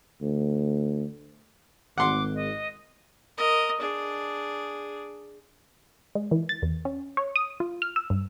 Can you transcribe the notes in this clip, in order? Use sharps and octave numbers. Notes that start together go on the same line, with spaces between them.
D2
G#1 F#5 C6 D6
D#5
A#4 D#5
D4 G#4
G#3
E3
A6
E2
C#4
C#5
D#6
F4
F6
E6
G2